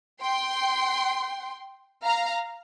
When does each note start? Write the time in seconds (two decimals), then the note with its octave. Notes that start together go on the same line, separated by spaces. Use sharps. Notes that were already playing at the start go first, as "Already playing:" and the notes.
0.21 G5 C6
2.04 F5 A#5